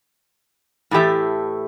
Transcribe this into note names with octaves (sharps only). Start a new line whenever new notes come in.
A2 E3 A3 G4 E5